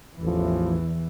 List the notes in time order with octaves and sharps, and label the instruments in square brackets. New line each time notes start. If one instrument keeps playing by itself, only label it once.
[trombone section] A1 A2 F3 [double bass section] E2 E3